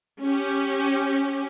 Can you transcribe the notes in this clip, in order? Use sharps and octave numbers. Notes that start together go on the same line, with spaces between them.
C#4 G4